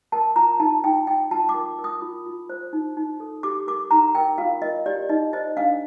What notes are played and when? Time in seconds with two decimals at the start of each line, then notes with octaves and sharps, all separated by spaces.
0.12 A#4 A5
0.36 F4 A#5
0.60 D#4 A5
0.84 D#4 G5
1.07 D#4 G5
1.31 F4 A5
1.49 D6
1.54 A#4
1.79 A#4
1.84 D#6
2.02 F4
2.26 F4
2.50 C5
2.73 D#4
2.97 D#4
3.20 A4
3.43 G4 D6
3.67 A#4 D6
3.91 D#4 A#5
4.15 A#4 G5
4.38 F4 F5
4.62 A#4 D#5
4.86 G4 D5
5.09 D#4 D#5
5.33 C5 D#5
5.57 D4 F5